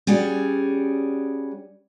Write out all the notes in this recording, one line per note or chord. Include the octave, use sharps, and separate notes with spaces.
G3 C#4 F#4 G#4 D5